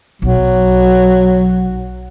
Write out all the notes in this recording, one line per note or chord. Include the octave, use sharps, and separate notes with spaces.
B1 F#3